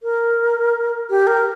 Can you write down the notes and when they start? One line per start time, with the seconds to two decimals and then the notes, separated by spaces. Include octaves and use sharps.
0.03 A#4
1.10 G4
1.27 A#4